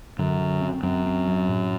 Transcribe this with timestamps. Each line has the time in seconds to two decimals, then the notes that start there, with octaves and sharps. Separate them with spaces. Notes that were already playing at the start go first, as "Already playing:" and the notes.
0.19 F#2 D3
0.40 D3
0.62 C4
0.83 F#2 C4
1.06 C4
1.27 F#3
1.49 A2